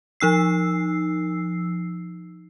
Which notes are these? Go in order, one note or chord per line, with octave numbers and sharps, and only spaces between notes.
F3 D#4 E6 C7